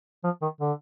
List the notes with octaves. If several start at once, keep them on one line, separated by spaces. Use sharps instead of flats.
F3
D#3
D3